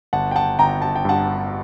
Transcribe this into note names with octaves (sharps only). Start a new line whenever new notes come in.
G1 F#5 A5
G5
F#5 A5
G1 G5 A#5
A5
G5
G2 F#5 A5